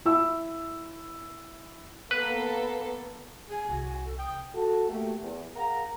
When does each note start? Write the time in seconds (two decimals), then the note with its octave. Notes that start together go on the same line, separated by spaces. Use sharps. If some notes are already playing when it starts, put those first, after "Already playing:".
0.05 E4 E6
2.11 A#3 B3 A4 B4
3.49 G#4 G#5
3.69 C2 F#4
4.05 A4
4.18 G5 D#6
4.55 F#4 A4 A5
4.89 A3 A#3 F#4 G4
5.22 E2
5.56 G#4 A#4 F5 F#5 A#5